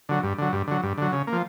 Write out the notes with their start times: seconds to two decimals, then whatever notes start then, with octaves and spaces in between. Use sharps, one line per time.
0.09 D3 F#3
0.23 G2
0.38 D3 F#3
0.53 G2
0.67 D3 F#3
0.83 G2
0.98 D3 F#3
1.12 C#3
1.27 A#3
1.32 F3